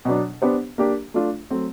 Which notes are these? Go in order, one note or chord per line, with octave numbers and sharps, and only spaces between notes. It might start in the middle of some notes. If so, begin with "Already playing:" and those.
B2 F#3 B3 D4
B3 D4 G4 C5
A#3 D4 G4
A3 D4 F4
F#3 A3 C4